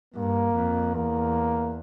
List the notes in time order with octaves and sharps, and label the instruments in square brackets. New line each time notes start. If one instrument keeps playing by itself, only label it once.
[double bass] G2 [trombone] A#3
[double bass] F2
[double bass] E2 [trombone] A#3